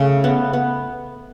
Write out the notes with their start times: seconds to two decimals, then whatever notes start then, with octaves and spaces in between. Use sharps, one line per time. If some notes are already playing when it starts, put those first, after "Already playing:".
Already playing: C#3 A3 C#4
0.24 B3
0.53 B3